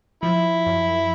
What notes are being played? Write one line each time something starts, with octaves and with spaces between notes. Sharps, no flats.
F3 E4
F#2